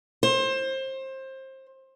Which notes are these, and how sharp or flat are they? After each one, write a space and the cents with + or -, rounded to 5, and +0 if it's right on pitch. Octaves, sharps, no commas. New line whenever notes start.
C5 +25